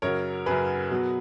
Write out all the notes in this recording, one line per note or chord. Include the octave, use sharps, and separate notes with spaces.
F#2 C#3 F#3 A#4 C#5
F#2 C#3 F#3 G#4 B4
B2 F#3